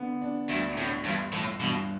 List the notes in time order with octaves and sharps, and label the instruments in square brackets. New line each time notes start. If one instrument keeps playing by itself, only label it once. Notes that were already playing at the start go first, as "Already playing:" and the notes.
Already playing: [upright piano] D3 B3
D4
[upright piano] D2 [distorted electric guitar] G2
[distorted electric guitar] A2 [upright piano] D3
[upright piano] G1 [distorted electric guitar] G2
[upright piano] G1 [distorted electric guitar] A2
[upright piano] G2 [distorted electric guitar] B2